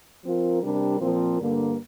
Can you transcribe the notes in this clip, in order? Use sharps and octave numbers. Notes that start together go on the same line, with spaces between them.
F3 C4 F4 A#4
C3 G3 D4 G4 A#4
A#2 F3 C4 F4 A#4
G2 D3 A#3